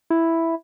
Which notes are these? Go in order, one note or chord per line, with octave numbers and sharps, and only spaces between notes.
E4